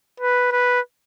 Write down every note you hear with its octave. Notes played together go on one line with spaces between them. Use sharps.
B4
B4